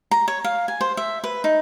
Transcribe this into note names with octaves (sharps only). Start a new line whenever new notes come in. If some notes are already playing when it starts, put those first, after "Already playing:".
A#5
C#5
F5
G#5
C5
E5
B4
D#4